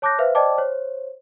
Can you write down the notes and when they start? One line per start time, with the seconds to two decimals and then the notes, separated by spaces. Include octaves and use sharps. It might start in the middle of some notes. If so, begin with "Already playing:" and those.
0.02 C#5 A5 D6 F#6 G6 A#6
0.19 B4 C5 E5 F5
0.35 C5 D5 D#5 G5 A5 D6
0.58 C5 C#5